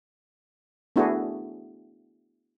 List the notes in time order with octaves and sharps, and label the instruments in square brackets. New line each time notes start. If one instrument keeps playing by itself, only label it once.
[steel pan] A3 B3 D4 E4 F#4 G#4